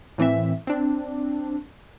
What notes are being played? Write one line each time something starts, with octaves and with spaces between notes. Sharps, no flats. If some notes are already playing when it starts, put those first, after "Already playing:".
A2 E3 C4 E5
C4 D4